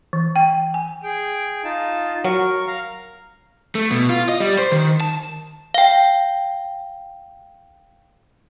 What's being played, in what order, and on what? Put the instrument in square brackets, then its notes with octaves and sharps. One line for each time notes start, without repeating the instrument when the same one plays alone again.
[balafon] E3
G5
G#5
[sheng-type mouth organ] G#4 G5
D#4 F4 A5
[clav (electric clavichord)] F#3 [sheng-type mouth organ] A#4 C#6
[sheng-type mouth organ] F5 A#5
[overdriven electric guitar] A3
B2
F4
D#5
G3
C5
D#3
A5
[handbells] F5 G5